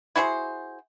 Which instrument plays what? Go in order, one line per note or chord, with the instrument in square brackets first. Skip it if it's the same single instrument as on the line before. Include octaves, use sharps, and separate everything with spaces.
[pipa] E4 F#4 G#4 C5